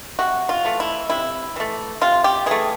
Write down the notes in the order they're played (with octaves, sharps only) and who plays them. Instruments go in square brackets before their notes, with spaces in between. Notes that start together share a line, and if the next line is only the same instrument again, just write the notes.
[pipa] C3 F#4
F4
E3 A3
E4
C3 E4
E3 A3
C3 F4
G4
E3 A3 G#4